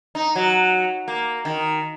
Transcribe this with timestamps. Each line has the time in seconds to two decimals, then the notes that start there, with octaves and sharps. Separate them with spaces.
0.15 D#4
0.36 F#3
1.08 A#3
1.45 D#3